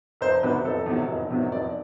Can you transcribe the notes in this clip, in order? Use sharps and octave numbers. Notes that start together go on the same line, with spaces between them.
F1 C5
E2 C3 D#3 F#3 B4
F1 A4
E2 C3 D#3 F#3
F1
E2 C3 D#3 F#3
F1 D5